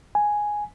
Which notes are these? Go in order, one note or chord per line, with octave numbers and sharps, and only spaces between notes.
G#5